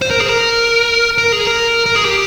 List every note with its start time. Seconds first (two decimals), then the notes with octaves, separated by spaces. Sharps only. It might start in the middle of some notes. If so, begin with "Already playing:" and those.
0.02 C5
0.11 A#4
0.20 G#4
0.29 A#4
1.18 A#4
1.32 G#4
1.47 A#4
1.86 A#4
1.95 G#4
2.05 G4